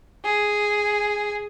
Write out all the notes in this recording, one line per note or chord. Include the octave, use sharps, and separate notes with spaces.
G#4